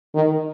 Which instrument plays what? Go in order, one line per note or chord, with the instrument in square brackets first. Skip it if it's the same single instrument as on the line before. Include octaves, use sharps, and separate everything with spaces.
[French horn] D#3